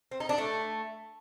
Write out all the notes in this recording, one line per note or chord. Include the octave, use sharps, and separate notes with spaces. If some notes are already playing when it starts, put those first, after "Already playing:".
C4
D#4
D4
A3